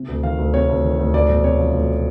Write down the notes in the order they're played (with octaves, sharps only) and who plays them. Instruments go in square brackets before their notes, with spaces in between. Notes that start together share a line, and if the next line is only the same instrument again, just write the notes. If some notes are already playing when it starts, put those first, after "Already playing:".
Already playing: [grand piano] C3
D2
D#3 F5
D2
C3 C#5
D2
D#3
D2
D2 D5
E1
C3 C#5
F3
D2